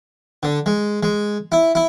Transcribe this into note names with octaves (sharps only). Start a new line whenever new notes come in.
D3
G#3
G#3
E4
E4